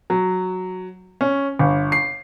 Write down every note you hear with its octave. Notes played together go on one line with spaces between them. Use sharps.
F#3
C#4
G1
C7